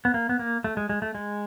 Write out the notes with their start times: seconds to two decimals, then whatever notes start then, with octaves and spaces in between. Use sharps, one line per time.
0.05 B3
0.14 A#3
0.29 B3
0.39 A#3
0.64 A3
0.77 G#3
0.89 G#3
1.02 A3
1.15 G#3